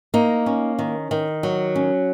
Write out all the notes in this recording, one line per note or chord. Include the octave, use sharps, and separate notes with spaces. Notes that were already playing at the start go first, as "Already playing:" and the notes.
A#3 D#4
C#4
D#3
D#3
F#3
C#4